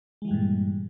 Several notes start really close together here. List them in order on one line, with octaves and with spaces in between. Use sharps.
G#3 E3 G3 G2 A#2